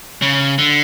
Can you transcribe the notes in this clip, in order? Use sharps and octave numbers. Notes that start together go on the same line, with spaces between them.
C#3
D3